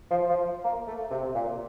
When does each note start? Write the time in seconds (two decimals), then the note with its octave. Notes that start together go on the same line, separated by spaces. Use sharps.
0.11 F3
0.29 F3
0.64 A#3
0.87 A3
1.11 C3
1.34 A#2